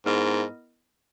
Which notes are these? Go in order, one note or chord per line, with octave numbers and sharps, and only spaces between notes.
G#2 B3 E4 A#4 D#5